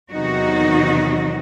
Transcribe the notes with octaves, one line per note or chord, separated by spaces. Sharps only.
E2 C3 D#3 F#3 D#4 F#4